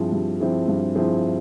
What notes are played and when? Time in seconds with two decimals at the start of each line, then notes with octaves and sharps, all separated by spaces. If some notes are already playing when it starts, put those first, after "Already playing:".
Already playing: G2 F3 C4 E4 G#4
0.12 G2
0.40 F3 C4 E4 G#4
0.68 G2
0.95 F3 C4 E4 G#4